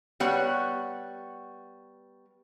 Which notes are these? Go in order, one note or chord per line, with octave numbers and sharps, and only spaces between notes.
G3 B3 C#5 F#5